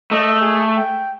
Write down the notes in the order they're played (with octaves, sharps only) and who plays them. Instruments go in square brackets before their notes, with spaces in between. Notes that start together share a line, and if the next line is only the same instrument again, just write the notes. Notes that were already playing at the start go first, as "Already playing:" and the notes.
[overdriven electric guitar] A3 [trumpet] D#5
[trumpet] G#4
G5